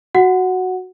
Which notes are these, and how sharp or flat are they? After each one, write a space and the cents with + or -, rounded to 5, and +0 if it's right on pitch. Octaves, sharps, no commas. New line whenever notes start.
F#4 +0 F#5 +0